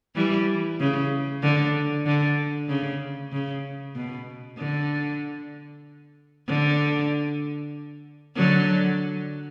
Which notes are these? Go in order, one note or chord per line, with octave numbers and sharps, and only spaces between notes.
E3 G3
C#3
D3
D3
C#3
C#3
B2
D3
D3
D3 F#3